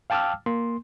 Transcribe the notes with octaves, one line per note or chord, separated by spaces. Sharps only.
F5 G5 A5 D6 E6 F6
A#3 C6